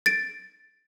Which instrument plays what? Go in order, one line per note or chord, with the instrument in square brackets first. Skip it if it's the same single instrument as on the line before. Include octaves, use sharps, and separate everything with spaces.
[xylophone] A6 D7